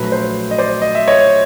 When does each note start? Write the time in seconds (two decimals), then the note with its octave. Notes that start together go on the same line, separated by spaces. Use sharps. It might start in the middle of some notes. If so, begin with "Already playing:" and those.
Already playing: A#1 A#2 F#3 A3 B4
0.12 C5
0.51 D#5
0.58 C5 D5
0.82 D#5
0.95 E5
1.08 C#5 D#5